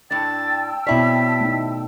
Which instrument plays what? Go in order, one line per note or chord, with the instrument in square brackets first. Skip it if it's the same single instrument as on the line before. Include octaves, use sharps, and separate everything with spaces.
[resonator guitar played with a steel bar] A2 D4 [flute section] G5 A5 E6 [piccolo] A6
[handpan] B2 D5 [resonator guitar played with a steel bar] C4 E4 C#5 [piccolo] B6
[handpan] A3 D#4